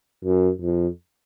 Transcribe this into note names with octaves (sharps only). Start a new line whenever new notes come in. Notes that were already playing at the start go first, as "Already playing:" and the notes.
F#2
F2